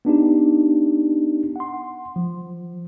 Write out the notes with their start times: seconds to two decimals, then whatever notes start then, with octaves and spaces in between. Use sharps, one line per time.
0.05 B3 D4 D#4 G4
1.56 F#5 C6
2.16 F3